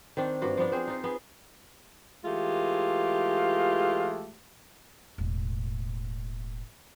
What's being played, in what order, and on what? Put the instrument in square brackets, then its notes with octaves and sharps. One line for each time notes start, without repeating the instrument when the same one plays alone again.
[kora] D#3 C4 D4
G2 A#3 F4 F#4
F3 B3 D4
C4 G#4 C5
D#4 F4
B3 G#4
[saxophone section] E3 G#3 A3 F4 G4
[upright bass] E1 A2